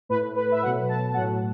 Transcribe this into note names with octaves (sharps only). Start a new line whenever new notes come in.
A2 A3 B4
B4
E5
B2 F#3 A3 F#5
A5
A2 F#3 A3 F#5